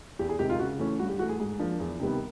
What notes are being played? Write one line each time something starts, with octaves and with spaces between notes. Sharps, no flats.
E2 G4
G#4
C3 D#3 G#3 G4
F4
C#3 F#4
E3 A3 C#4
G2 F#4
G4
E3 A3 F#4
G#4
G#2 G#4
F3 A#3 D4
E2
C3 D#3 G3 B3